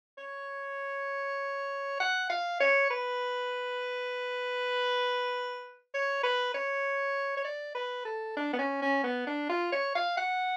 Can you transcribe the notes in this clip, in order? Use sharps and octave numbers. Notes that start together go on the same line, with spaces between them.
C#5
F#5
F5
C#5
B4
C#5
B4
C#5
C#5
D5
B4
A4
D4
B3
C#4
C#4
B3
D4
F4
C#5
F5
F#5